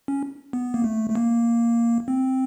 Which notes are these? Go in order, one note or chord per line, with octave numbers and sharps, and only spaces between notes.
C#4
B3
A#3
A3
A3
A#3
C4